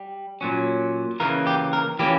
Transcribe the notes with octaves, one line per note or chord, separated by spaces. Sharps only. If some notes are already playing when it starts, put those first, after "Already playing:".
Already playing: G3
A#2 F#3 C#4
C#3 E3 A#3 A#4
G4
A#4
E3 A#3 C#4 G4